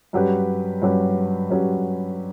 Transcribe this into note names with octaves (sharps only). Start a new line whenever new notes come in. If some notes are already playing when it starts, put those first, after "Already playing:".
G2 F#3 C#4 G4 B4
G2 F#3 C#4 G4 B4
G2 F#3 C#4 G4 B4